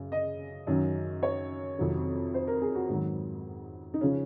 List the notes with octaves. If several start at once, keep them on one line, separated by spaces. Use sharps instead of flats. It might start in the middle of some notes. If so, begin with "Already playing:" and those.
Already playing: F#2 C#3
D#5
F#2 D#3 F#3
C#5
F2 C3 D#3 F#3
C5
A#4
G#4
F#4
G#2 D#3 F#3
D#4
C#3 F3 C#4